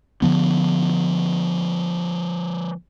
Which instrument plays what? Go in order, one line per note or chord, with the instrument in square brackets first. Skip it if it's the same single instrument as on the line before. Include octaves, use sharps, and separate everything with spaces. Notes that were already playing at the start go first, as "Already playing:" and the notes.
[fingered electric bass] D3 F3 B3